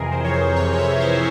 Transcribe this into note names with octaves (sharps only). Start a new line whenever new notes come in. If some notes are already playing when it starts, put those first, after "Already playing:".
Already playing: F2 C3 E3 G#4 A#4
C5
C#5
C5
F2 C3 E3 C#5
C#5
E5
C5